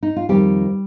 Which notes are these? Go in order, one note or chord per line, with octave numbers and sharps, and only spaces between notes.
D#4
F4
F2 D#3 G3 G4